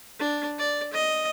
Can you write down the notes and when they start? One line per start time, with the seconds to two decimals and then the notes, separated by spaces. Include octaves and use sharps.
0.20 D4
0.59 D5
0.93 D#5